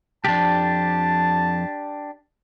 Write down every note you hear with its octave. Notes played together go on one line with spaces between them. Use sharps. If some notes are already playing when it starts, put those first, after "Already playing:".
C2 F2 D4 G4 A5